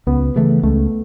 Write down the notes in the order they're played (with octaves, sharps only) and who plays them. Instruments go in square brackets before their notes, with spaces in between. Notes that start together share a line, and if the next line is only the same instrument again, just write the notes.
[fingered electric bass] C#2 [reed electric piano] B3
[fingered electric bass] C#3 E3 A3
[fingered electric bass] C#2 [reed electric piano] A3